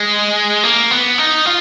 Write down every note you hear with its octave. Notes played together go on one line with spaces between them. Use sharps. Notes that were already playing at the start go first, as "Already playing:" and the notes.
Already playing: G#3
A#3
B3
D#4
F4